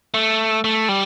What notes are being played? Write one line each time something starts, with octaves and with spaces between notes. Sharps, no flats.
A3
A3
G3